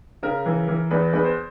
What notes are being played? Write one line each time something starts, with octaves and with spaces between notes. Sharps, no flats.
C#3 A#4
E3
E3
E2 B4
E2 B4
C5